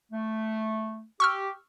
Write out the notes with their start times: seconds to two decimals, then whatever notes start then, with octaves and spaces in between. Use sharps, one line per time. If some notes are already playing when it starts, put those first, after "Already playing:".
0.12 A3
1.20 G4 C#6 E6 F6